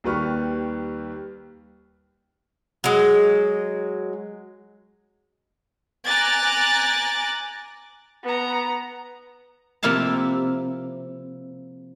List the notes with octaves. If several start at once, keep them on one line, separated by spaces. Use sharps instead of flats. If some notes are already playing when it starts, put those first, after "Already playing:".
D#2 D#3 G3 B4 C#6 F6
F#3 G#3
G#5 A#5 D6 F#6 A6
B3 A#5
C3 F3 A#3 E4 F5 A5